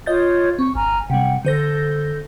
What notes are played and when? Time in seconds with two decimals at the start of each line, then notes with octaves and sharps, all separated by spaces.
0.06 F4 C#5 D#5 G6 A6
0.59 C4 C#6
0.75 G1 G#5 A#5 F6
1.10 C3 G3 F#5 G5
1.45 D3 A4 C5 G6 A#6